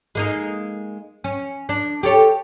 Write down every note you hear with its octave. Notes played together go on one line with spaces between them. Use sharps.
G#3 A#3 D#4
C#4
D4
G4 A4 C#5